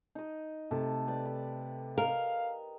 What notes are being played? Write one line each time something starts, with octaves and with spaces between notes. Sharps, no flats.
D#4 D#5
C3 A3 A4
G4 B4 D5
B5
A#4 D#5 F5